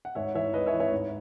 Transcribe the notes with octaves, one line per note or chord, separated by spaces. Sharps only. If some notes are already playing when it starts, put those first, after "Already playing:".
F#5
G#2 C#5 E5
E3 C#5 E5
G#2 B4 D#5
C#5 E5
E3
C#5 E5
G#2